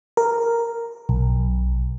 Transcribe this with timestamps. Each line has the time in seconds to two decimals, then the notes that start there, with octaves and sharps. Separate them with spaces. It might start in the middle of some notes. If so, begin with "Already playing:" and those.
0.17 A#4
1.09 B1